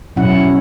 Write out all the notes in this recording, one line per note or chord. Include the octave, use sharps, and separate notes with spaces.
B2 F#3 C#4 E4 F#5